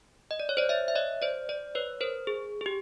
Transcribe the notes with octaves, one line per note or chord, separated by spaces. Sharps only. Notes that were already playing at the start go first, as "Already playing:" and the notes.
D#5
D5
C#5
C5 D5
D5 E5
E5
C#5 D#5
C5 D5
C5 D5
B4 C#5
A#4 C5
G#4
G#4
G4